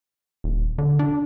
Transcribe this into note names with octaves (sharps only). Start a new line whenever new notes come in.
D#1
D3
D4